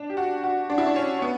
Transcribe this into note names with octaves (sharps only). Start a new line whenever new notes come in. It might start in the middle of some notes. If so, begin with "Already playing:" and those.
Already playing: D4
G4
F#4
F#4
D4
E4
D4
C#4
C#4
B3